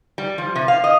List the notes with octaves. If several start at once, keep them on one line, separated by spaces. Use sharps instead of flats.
G3
F3
C3
F5
D#5